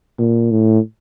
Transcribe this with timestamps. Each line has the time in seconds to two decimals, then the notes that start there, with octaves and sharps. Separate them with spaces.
0.18 A#2
0.51 A2